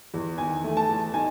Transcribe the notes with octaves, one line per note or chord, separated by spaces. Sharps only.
E2
D#3 G#5
A3
A5
E2
D#4 G#5